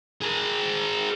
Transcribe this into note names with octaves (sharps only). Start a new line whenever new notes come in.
G#4 A#4